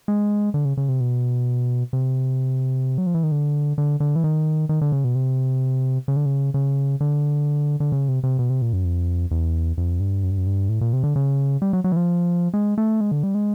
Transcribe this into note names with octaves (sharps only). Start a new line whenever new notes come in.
G#3
D3
C#3
C#3
C3
B2
C3
F#3
F3
E3
D#3
D3
D3
D3
E3
D#3
D#3
D3
C#3
B2
C3
C#3
D3
C#3
C#3
D3
D3
C#3
C3
C3
B2
C3
A#2
F#2
F2
E2
F2
G2
F#2
G2
F#2
G2
A2
A#2
C3
D3
C#3
G3
F#3
F#3
E3
F3
G#3
A3
G#3
D3
G3
G#3